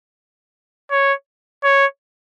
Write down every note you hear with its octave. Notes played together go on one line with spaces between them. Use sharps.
C#5
C#5